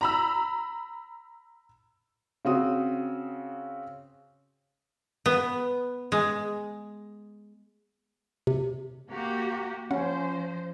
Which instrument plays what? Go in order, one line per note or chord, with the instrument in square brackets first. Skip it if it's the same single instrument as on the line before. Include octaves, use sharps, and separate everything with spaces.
[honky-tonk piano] A#5 B5 E6
[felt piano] C#3 C4 F#4 D#6
[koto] B3
G#3
[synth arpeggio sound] C3
[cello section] A#3 F#4 G4
[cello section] F3 C5 [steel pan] C#4 [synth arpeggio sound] F#5